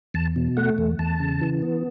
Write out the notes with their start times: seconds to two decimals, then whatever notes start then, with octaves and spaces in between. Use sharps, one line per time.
0.14 E2 A5
0.36 B2
0.57 A3 F#5
0.78 E2
0.99 E2 A5
1.20 C#3
1.41 E3
1.62 B3